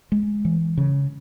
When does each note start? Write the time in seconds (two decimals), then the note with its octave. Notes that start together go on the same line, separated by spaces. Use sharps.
0.12 G#3
0.45 E3
0.77 C#3